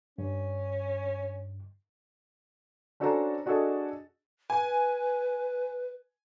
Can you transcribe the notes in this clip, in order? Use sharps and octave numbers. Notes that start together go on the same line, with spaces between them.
G2 C#4
C#4 D4 F#4 A4 C5 A#5
D4 F#4 G#4 A4 D#5
B4 G#5